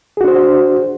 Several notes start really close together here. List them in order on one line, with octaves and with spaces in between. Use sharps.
G#4 F#4 D4 C5